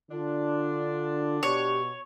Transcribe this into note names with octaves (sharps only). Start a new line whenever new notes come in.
D3 D4 F4
B2 G4 C#5